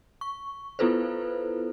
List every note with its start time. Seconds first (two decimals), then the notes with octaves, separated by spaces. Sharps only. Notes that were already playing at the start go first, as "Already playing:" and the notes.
0.21 C#6
0.79 B3 E4 F4 A4 B4 C5